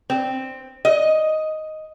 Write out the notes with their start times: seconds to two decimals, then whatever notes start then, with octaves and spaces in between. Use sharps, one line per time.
0.10 C4
0.85 D#5